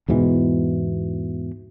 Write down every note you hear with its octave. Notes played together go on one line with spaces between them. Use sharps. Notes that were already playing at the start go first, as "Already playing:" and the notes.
E2 G#2 B2 E3